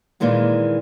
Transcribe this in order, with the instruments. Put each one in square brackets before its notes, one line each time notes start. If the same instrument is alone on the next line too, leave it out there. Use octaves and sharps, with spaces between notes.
[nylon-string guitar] A#2 D#3 E3 G#3 A#3